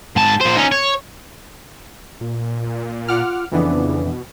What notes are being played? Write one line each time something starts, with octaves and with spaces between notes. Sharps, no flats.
G#2 A5
A#2 C5
C#4 D#4
C#5
A#2
F4 F#5 D6 F6
F2 C#3 E3 B3 D4
B2